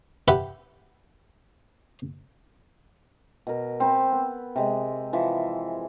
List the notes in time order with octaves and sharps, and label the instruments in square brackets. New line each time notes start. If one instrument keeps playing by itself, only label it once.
[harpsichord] G4 B4 E5 F#5
[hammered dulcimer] B2 A#4
C4 C5 B5
B3
C3 G#3
E3 F3 E4 E5